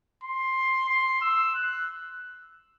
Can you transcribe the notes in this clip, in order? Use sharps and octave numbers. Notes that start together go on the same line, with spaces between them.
C6
C6
E6
F#6